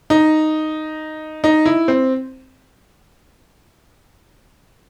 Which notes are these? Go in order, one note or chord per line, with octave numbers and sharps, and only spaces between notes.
D#4
D#4
E4
C4